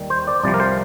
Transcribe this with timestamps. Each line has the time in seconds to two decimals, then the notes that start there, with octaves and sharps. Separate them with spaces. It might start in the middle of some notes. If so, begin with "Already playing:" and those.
Already playing: D#2 D#3 G3
0.10 C5
0.27 D5
0.44 C2 C3 F3 D5
0.54 A#4
0.60 C5